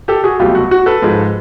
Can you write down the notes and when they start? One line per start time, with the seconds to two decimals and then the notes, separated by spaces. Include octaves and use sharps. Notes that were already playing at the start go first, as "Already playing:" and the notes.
0.08 G4 A4
0.24 F#4 G#4
0.39 C2 B2 F#3 A3 F4 G4
0.55 F#4
0.71 F#4
0.86 A4 B4
1.02 G#2 F3 G#3